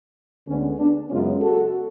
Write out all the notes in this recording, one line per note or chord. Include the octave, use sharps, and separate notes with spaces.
D2 D3 G#3 B3 C#4
B3 D4
F#2 C#3 G#3 B3 C#4 F4
F#4 A4